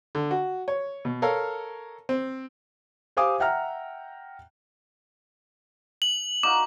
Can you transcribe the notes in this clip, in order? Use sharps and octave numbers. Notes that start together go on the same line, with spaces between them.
D3
F#4
C#5
B2
A4 A#4 C#5 F5
C4
G4 C5 F5 G#5 D6 D#6
E5 F#5 G5 A#5 F6
F#7
D#4 F#4 F5 D6